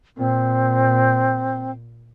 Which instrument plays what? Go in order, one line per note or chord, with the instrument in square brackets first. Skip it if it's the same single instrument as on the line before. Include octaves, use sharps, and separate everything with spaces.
[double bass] A#2 [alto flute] C4